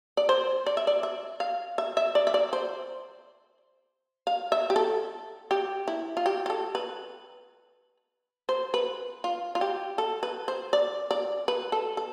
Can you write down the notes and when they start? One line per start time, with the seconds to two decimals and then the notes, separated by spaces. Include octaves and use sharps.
0.17 D5
0.29 C5
0.66 D5
0.77 E5
0.87 D5
1.03 E5
1.40 F5
1.78 E5
1.97 E5
2.15 D5
2.27 E5
2.34 D5
2.53 C5
4.27 F5
4.52 E5
4.70 G4
4.76 A4
5.51 G4
5.88 E4
6.17 F4
6.26 G4
6.46 G4
6.50 A4
6.75 B4
8.49 C5
8.74 B4
9.24 F4
9.55 F4
9.61 G4
9.98 A4
10.23 B4
10.48 C5
10.73 D5
11.11 D5
11.48 B4
11.72 A4
11.97 A4